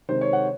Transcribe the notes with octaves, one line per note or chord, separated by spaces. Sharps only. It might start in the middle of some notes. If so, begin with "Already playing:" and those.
C3 D#3 G#3 C5
C#5
F#5